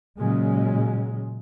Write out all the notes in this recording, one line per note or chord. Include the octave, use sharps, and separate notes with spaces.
A#2 C#3 F#3 G#3